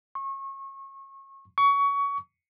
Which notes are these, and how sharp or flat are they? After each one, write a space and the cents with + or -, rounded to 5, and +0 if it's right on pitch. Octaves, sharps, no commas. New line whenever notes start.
C#6 -30
C#6 +25